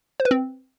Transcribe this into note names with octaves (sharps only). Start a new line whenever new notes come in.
C5
B4
C4